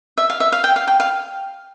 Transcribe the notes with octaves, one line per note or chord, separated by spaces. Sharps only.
E5
F5
E5
F5
G5
F5
G5
F5